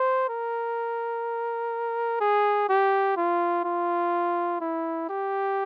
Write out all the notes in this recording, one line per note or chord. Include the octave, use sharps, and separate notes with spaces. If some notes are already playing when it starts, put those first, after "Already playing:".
Already playing: C5
A#4
G#4
G4
F4
F4
E4
G4